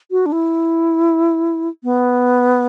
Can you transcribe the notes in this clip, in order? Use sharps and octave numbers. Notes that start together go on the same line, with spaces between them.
F#4
D4
E4
B3